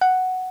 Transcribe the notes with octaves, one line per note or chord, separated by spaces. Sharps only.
F#5